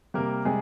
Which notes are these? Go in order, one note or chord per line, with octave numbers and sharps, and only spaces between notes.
C3 G3 A#3 A#4
C3 G3 G#3 G#4